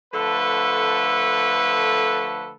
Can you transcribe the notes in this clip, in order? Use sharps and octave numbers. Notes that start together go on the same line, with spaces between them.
D3 F3 A3 A4 B4